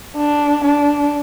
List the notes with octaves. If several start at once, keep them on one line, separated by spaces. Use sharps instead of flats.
D4
D4